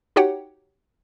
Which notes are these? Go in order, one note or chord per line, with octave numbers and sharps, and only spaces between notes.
D#4 F#4 G4 C#5 F#5 G5